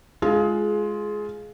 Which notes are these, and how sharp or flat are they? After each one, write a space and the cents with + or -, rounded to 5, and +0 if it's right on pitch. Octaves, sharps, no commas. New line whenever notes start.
G#3 +15 F4 +0 G#4 +25